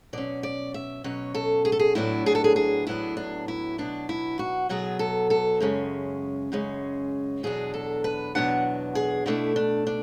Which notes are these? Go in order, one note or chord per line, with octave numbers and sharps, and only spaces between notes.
B2 F#3 C#4 D5
D5
E5
B2 F#3 C#4 C#5
A4
G#4
A4
G#4
A2 F#3 B3 D4 E4
G#4
A4
G#4
G#4
A2 F#3 B3 D4 E4
D4
E4
B2 F#3 B3 D4
E4
F#4
B2 F#3 B3 G#4
A4
A4
F#2 C#3 G#3 C#4
F#2 C#3 G#3 C#4
E2 B2 F#3 B3 D4 G#4
A4
B4
E2 B2 F#3 B3 D4 F#5
G#4
B2 A3 D4 E4
D4
D4